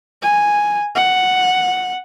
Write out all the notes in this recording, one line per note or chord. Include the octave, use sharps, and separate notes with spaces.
G#5
F#5